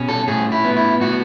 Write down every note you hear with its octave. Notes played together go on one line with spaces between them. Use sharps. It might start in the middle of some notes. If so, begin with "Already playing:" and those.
Already playing: B2 C#4
A4
A2 G#4
E4
B3
E4
A2 F#4